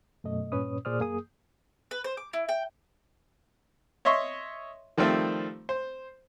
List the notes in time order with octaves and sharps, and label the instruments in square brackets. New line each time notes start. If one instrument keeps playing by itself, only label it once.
[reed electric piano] F#2 B2 A3 D#5
G2 A#2 C#4 B4 C#5 D#6
A#2 G#4 C5 D5 D#6 F6
F#2 A#3 G#4 D#6
[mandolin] B4
C5
D6
E4
G5
[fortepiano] C#5 D#5 E5 C6 C#6
D#3 F3 G3 A3 C4
C5